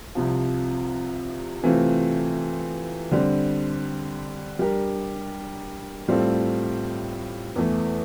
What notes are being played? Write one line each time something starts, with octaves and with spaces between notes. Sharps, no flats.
C2 C3 F3
C3 E3 A3 C4 F4
D3 G3 C4
G3 D4 G4 A#4
A2 G3 C4 F4 A4
E2 E3 A3